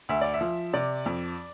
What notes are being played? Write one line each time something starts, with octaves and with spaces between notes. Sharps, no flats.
D2 E5
D5
E5
F3
C3 D5
F2